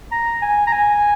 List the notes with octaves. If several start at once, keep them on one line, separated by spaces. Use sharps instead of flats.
A#5
G#5
A#5
G#5